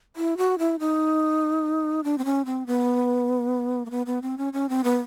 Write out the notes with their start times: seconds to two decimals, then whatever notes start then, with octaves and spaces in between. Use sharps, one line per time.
0.16 E4
0.37 F#4
0.59 E4
0.79 D#4
2.04 D4
2.18 C4
2.25 C#4
2.45 C4
2.67 B3
3.86 A#3
3.91 B3
4.06 B3
4.22 C4
4.38 C#4
4.53 C#4
4.69 C4
4.84 B3